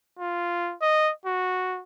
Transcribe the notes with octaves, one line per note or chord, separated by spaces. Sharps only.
F4
D#5
F#4